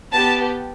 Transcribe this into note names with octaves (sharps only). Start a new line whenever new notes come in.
B3 G4 A5